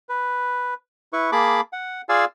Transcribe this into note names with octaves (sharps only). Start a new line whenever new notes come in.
B4
E4 B4 C#6
A#3 G#4 A5 B5 D6
F#5
F4 G#4 D5 F5 G#5 E6